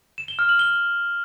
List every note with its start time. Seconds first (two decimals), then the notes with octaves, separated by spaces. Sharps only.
0.18 E7
0.28 G7
0.39 F6
0.49 F#7
0.59 G7